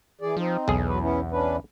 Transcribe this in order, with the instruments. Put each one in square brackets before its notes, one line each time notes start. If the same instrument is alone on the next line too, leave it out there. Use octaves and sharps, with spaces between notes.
[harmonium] E3 G#4 D5
[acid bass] F3 [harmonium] C4 D#4
[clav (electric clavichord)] B1 G#4 [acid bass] E2
[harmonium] F#3 B4
B3 C#4 E4
C#4 D4 B4